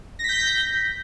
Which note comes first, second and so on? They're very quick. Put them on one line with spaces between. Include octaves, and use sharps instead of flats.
A#6 B6 G6